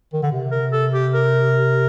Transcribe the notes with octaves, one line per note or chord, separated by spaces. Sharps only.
D#3
D3
C3
A#4
A4
G4
A#4